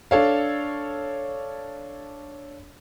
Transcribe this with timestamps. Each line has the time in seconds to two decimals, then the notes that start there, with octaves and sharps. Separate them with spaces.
0.11 D4 A4 C#5 F5